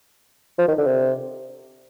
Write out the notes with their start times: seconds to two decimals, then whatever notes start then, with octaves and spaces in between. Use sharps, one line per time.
0.58 F3
0.68 D#3
0.78 D3
0.87 C3